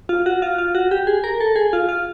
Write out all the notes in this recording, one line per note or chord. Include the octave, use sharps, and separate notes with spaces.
F4
F#4
F4
F4
F#4
G4
G#4
A#4
A4
G#4
F4
F4